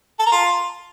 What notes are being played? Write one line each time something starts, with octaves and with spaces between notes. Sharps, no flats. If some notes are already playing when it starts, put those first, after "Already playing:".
A4
A#4
F4